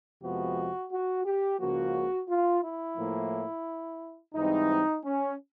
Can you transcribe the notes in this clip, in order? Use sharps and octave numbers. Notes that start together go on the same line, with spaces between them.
F2 C3 F3 G#3 B3 F#4
F#4
G4
C#2 C#3 F3 A#3 F#4
F4
E4
A2 F3 A#3
G#2 E3 G3 C4 D#4
C#4